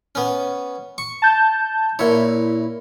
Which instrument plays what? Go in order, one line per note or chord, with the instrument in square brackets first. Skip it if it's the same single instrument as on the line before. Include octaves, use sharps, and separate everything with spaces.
[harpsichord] B3 C#4
C#6
[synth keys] A5 G6
[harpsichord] A#2 C#5 [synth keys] E4